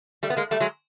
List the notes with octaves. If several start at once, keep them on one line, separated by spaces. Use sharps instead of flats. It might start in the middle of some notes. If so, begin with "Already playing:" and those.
G3 A3
B3
G#3 A#3
G3 A3
F#3 G#3